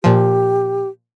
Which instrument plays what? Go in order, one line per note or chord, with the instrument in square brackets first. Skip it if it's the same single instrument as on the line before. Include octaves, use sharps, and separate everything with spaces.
[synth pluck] A#2 F3 [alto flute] G4